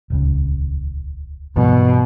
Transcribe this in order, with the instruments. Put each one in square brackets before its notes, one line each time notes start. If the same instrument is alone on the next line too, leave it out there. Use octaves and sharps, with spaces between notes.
[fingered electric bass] D#1 C#2 C#3
[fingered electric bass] G2 E3 F#3 [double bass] B2